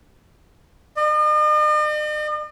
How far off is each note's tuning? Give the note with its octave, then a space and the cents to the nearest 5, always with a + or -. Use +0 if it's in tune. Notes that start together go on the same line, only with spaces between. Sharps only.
D#5 -45